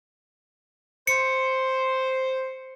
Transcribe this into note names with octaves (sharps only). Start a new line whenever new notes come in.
C5 C#7